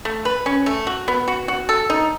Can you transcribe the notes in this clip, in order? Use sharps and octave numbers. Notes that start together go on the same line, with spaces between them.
A3
B4
C#4
A3
F#4
B3
F#4
F#4
A4
D#4